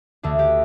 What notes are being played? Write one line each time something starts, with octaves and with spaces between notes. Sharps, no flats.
D2 D3 A3 D4
G4